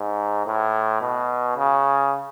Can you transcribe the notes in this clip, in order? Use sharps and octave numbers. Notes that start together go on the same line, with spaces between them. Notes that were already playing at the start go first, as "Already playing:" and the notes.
Already playing: G#2
A2
B2
C#3